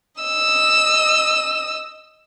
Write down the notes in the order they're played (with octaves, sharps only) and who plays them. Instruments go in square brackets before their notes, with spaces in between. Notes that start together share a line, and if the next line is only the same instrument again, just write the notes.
[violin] D#5 E6